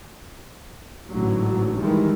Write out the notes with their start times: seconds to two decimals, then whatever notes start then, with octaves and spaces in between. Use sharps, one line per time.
1.11 A1 G#2 D3 F#3
1.78 G2 D#3 E3 G3 G#3